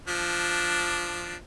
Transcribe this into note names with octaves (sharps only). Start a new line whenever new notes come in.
F3 D4